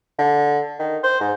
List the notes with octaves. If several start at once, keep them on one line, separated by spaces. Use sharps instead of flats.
D3
D#3
C5
G#2